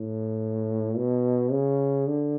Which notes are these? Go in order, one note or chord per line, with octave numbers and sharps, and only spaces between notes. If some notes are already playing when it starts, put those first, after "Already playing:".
Already playing: A2
B2
C#3
D3